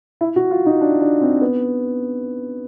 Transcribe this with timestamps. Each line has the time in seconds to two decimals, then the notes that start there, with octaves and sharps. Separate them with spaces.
0.21 E4
0.36 F#4
0.51 F4
0.66 D#4
0.81 D4
1.01 D4
1.21 C4
1.41 B3